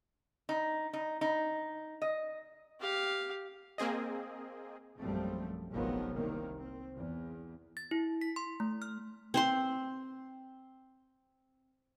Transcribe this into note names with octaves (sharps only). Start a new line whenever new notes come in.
D#4
D#4
D#4
D#5
G4 F5
A#3 C4 G#4 D#5
A#1 F#2 F3 G3 A3 C4
F1 A#1 D#3 F3 F#3 B3
C2 C3 D#3 A#3
C4
E2
A6
E4
B6
C6
A3
F6
C4 C5 C6